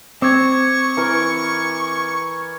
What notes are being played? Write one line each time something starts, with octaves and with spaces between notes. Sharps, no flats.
C4 C#6 D6 G#6
E3 A#4